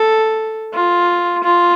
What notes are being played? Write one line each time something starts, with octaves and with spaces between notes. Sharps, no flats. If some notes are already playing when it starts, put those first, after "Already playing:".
Already playing: A4
F4
F4